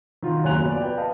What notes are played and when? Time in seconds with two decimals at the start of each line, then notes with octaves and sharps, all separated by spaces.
0.23 D#3 F4 F#4
0.44 F#1 D#2 B2 G#5 F#6 F7
0.58 B3
0.70 D5
0.82 B4 G5
0.98 D#5 F5 A5